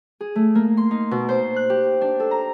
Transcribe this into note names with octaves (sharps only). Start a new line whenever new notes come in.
G#4
A3
A#3
C6
D#4
B2
C5
F#6
G4
D4
A4
A#5